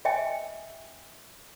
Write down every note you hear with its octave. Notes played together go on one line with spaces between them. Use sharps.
D#5 E5 G5 G#5